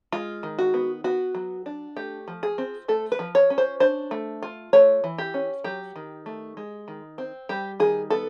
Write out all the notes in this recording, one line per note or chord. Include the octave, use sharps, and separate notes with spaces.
G#3 F4
D#3
F#4
B3
B3 F#4
F#3
D4
A3 G4
F3
G#4
C4
A3 A4
B4
F3
C#5
C#4
C5
D4 C5
A3
F4
A3 C#5
E3
G4
C#4
F#3 G4
D#3
A3
G#3
D#3
C4
G3 G4
D#3 G#4
B3 A4